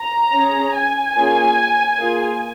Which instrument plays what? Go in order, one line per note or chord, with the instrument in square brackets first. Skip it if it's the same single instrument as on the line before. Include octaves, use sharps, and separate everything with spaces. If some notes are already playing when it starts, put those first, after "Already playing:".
Already playing: [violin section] A#5
C#4
G#4
G#5
A#3 C#4 F4 G#4
A#3 F4 G#4